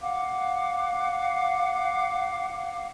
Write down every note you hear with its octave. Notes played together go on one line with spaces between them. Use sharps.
F5 F#5 D6